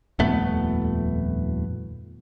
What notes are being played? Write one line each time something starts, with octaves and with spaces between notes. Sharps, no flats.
D#1 F2 A3 B3